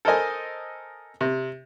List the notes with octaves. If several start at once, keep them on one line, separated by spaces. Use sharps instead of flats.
A4 A#4 C5 D#5 G#5
C3